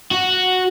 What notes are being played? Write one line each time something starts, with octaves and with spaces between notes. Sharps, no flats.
F#4